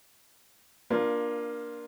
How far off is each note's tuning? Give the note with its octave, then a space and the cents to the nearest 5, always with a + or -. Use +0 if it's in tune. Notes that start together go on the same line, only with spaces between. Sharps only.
A#3 +20 D4 +5 F4 +0